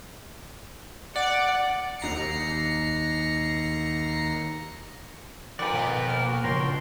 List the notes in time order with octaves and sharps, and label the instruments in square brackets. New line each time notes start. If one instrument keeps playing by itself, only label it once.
[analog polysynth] D5 [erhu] F#5
[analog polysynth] D#2 A#5 C7 C#7
[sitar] F2 [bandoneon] D#3 F#6 [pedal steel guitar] B4 D5
[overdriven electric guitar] B2 F#5 [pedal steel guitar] B3 D#4 B4
[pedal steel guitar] A#3 [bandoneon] G5 F6
[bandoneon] F#4
[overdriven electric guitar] C#2 G#2 [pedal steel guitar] F3 F#4 A#4 [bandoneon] C#5 G5 C6
[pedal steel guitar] D4